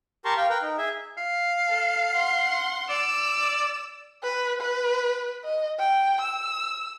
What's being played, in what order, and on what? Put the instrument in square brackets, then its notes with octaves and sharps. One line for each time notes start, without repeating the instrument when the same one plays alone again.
[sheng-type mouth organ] G4 A#4 A5 A#5 C6 C#6
F5 G5
A#4 B4 G5
D#4
G#4 E5
[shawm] F5
[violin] A4
F#5 C6
[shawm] D5 [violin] E6
[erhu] B4
B4
D#5
G5
E6